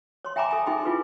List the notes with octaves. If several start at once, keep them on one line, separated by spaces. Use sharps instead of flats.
C#5 C6
E5 G5 G#5 A#5 B5 D6
A4 E5 G#5
D#4 G#4 E5 G5 B5 C6
E4 F4 G#4 B4